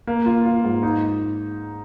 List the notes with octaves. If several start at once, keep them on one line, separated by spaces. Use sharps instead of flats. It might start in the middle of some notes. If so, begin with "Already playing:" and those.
A#3
F4
F4
G#2
D#4